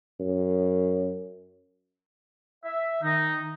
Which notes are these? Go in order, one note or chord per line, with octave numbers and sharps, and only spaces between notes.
F#2
E5
D#3 D#4